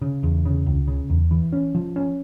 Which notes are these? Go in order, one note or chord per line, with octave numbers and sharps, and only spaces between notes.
C#3
E2
C#3
C#2
C#3
E2
E3
C#4
F3
C#4